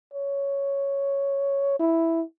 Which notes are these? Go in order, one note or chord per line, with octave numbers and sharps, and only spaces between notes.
C#5
E4